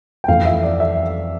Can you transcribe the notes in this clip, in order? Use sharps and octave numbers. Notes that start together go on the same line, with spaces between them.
G5
F2 E3 A3 F5
E5
D5
E5